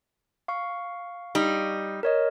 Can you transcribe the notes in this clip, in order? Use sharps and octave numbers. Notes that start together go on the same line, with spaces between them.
F5 C#6
G3 D#4
A#4 C#5 D#5